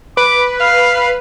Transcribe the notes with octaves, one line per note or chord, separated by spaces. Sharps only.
B4 D6
F5 F6